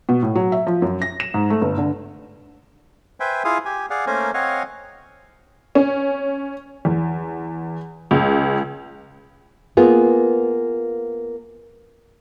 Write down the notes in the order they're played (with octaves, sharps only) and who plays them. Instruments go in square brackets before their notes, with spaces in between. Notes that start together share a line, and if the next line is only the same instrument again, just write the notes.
[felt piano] B2
A2
F#3
E5
F3
F#2
A#6
E7
G#2
A3
G1
D3
[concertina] B4 C5 E5 G5 G#5
E4 F4 G#4 F5 D#6
G4 G#5
G#4 D5 F5 F#5
A3 A#3 C#4 A#4 C5 G#5
C4 C#5 D#5 F5 F#5 G#5
[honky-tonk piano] C#4
E2
C#2
[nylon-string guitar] A#3 B3 F4 G#4